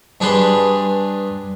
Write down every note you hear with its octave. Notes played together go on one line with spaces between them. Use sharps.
G2 D4 G#4 B4 C6